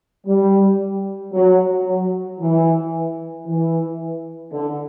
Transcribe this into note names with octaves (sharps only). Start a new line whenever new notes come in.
G3
F#3
F#3
E3
E3
D3